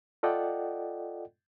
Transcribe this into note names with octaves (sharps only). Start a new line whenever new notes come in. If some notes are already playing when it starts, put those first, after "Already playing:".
F4 A4 D5 D#5 F#5 G5